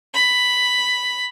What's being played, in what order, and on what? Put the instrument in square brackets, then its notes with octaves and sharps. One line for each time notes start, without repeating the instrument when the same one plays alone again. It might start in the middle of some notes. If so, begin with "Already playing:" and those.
[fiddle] B5